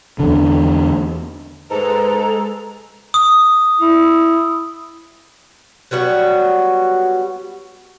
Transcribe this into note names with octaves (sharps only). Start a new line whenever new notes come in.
E2 D3
G#2 G#3 A4 B4 A#5
D#6
E4
F#3 G3 B3 F#4